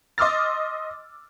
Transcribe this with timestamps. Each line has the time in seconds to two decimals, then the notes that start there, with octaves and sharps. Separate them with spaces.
0.18 D#5 C6 D6 E6 F6 A6